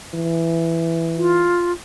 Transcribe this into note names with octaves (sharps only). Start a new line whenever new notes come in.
E3
F4